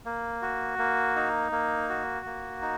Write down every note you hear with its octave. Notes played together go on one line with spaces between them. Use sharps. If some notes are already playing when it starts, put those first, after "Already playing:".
A#3
F#4
A#3
D#4
A#3
F#4
A#3
D#4